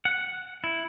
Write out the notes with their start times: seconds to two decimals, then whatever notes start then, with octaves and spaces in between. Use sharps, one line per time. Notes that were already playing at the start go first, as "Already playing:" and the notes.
0.05 F#5
0.64 E4